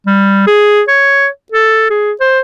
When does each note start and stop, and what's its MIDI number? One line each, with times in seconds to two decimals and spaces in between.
0.07 0.46 55
0.47 0.81 68
0.88 1.27 73
1.52 1.88 69
1.90 2.12 68
2.20 2.40 72